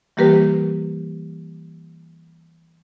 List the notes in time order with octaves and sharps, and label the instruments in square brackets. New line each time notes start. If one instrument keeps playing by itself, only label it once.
[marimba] E3 G3 A#3 G4 A#4 B4